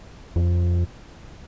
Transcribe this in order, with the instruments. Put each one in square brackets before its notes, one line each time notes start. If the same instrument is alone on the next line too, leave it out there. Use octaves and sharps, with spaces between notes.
[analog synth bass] F2